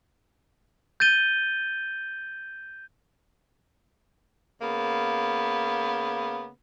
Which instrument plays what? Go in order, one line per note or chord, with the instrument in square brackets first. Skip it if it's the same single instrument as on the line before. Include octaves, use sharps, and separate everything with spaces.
[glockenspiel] G6 A6 D#7 G7
[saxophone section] C#3 A#3 B3